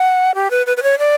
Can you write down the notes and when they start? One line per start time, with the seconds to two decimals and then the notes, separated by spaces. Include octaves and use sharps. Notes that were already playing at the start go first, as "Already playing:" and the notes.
Already playing: F#5
0.35 G4
0.51 B4
0.66 B4
0.77 B4
0.83 C#5
0.99 D5